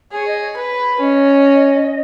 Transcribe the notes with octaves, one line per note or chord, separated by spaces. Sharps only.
G#4 C#5
D#5
C#5
B4
C#4 D#5